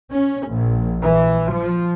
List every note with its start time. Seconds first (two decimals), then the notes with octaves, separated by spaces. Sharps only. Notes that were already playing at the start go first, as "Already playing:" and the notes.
0.11 C#4
0.49 A#1
1.03 E3
1.53 F3